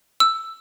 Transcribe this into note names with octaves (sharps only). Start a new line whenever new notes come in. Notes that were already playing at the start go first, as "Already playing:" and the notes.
E6